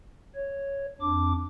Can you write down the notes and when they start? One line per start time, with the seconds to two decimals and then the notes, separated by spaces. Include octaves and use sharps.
0.35 C#5
1.01 F2 D4 D6